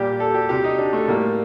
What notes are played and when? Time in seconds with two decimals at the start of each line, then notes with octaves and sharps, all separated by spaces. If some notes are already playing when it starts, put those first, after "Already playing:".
Already playing: A#2 G3 G4
0.20 A4
0.34 G4
0.49 C3 G3 G4
0.64 D#4
0.78 D4
0.93 A3
1.08 A2 G3 A#3